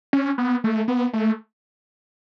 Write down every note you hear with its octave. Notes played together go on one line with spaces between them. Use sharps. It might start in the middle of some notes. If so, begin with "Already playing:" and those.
C#4
B3
A3
B3
A3